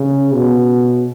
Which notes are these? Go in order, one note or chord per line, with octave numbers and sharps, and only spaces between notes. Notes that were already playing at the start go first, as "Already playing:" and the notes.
Already playing: C#3
B2